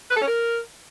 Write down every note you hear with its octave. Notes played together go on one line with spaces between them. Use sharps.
B4
A4
C#4
A#4